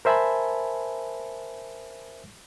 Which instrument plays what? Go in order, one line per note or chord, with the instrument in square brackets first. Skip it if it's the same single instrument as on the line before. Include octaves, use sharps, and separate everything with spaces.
[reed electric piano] A#4 C5 E5 G#5 A5 B5